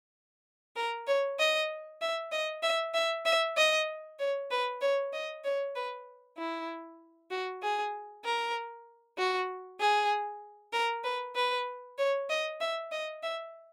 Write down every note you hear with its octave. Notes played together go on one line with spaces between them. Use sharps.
A#4
C#5
D#5
E5
D#5
E5
E5
E5
D#5
C#5
B4
C#5
D#5
C#5
B4
E4
F#4
G#4
A#4
F#4
G#4
A#4
B4
B4
C#5
D#5
E5
D#5
E5